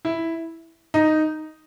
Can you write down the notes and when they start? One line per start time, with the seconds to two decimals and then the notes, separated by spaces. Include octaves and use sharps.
0.05 E4
0.94 D#4